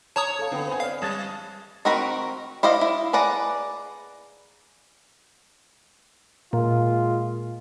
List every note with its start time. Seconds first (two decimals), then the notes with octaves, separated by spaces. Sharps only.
0.16 C#5 A5 A#5 D#6
0.39 A4 F5
0.52 D3 B3 F5 G5
0.67 C5 G#5
0.80 C#5 D5 F5 F6
1.02 G3 D#6 G#6 A6
1.85 D#3 C4 F#4 A#4 B5
2.63 E4 C5 D5 D#5 F5
2.81 E4
3.13 G#4 B4 D5 F#5 A#5
6.53 A#2 G#3 F4